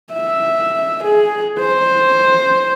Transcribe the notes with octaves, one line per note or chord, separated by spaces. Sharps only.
E5
G#4
C5